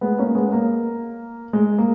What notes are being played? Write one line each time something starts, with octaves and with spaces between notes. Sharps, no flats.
G#3 B3
A#3 C#4
G#3 B3
A#3
G#3
A#3